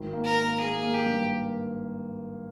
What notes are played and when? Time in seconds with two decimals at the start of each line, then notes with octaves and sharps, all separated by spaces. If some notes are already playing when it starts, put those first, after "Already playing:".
Already playing: G#1
0.13 A#3
0.25 A#4
0.37 A#3
0.60 A#3 G#4
0.83 A#3
0.94 G4
1.06 G2